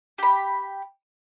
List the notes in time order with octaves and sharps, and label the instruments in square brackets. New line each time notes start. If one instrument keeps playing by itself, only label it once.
[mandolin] G4 B5